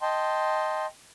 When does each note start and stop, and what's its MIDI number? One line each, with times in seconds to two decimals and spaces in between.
0.01 0.86 75
0.01 0.86 79
0.01 0.86 81
0.01 0.86 84